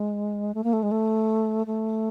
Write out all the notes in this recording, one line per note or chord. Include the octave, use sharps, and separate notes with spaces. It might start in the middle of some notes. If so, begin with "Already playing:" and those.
Already playing: G#3
A3
A#3
A3
G#3
A3
A3